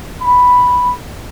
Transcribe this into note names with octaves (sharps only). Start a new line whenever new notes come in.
B5